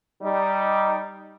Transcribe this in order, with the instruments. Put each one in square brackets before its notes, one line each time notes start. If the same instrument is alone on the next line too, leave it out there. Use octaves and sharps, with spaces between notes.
[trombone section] G3 D#4